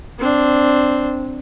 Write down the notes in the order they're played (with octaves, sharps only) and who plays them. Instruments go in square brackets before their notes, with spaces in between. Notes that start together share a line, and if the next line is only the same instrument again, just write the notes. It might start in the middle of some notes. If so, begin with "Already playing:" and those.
[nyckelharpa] C4 D4